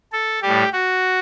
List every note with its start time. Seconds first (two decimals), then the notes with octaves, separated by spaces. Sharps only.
0.13 A4
0.42 A2 G3 G4
0.73 F#4